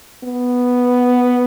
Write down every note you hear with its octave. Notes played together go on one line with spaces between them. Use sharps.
B3